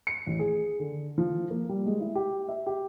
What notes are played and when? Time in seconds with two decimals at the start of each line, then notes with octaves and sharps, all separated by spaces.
0.07 C#7
0.27 A1
0.39 G#4
0.79 D3
1.18 F3
1.50 A#3
1.69 G3
1.86 G#3
2.00 E4
2.15 G4
2.49 E5
2.66 G4